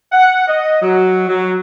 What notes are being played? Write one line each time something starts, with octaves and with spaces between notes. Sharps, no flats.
F#5
D#5
F#3
F#3